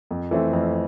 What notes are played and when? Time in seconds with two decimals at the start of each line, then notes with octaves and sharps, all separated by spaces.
0.11 F2
0.31 E3 A3 C4
0.53 F2